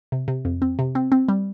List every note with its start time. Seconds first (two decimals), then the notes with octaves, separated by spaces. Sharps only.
0.12 C3
0.28 C3
0.45 F2
0.62 C4
0.79 C3
0.95 C4
1.12 C4
1.28 G3